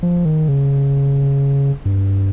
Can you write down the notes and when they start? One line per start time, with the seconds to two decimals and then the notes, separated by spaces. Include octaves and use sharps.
0.03 F3
0.25 D#3
0.48 C#3
1.85 G2